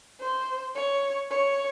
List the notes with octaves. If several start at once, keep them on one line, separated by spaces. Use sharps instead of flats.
C5
C#5
C#5